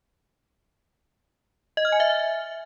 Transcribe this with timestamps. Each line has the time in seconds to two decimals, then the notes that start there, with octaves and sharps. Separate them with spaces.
1.77 D#5
1.85 F6
1.92 G#5
2.00 E5